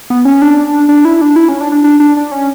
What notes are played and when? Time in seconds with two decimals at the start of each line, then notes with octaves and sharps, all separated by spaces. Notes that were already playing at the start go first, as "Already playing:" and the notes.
0.10 B3
0.25 C#4
0.42 D4
0.89 D4
1.05 E4
1.21 D4
1.36 E4
1.49 C#4
1.61 D4
1.72 D4
1.84 D4
2.00 D4
2.17 D4
2.32 C#4